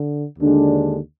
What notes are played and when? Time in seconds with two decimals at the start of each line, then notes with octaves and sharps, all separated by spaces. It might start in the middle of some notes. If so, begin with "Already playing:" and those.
Already playing: D3
0.39 D#2 D3 G#3 D4